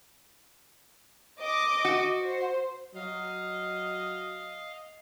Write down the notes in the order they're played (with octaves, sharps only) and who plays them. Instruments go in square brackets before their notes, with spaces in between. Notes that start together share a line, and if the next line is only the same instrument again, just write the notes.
[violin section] D#5 D6
[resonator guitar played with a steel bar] F#4
[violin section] C5
[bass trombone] F#3 [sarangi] D#5 [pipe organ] F5